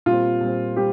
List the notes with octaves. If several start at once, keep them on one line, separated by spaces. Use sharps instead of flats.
A#2 G3 C4 F4
A#2 G3 C4
G3 C4 G4